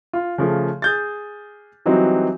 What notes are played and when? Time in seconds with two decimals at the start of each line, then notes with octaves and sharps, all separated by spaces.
0.13 F4
0.38 C#3 F3 A3
0.82 G#4 G6 A6
1.86 E3 F#3 G3 C4 D#4